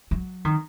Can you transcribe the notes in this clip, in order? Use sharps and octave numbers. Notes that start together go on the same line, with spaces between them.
F#3
D#3